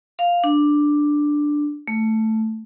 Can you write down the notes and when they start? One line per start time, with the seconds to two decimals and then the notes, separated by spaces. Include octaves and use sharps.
0.19 F5
0.44 D4
1.88 A3